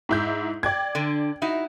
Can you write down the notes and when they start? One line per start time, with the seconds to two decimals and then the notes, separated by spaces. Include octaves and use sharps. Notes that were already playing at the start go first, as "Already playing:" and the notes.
0.09 G#2 E4 G6
0.63 D5 G5 G#6
0.95 D3 D4
1.42 D#4 E4 F#4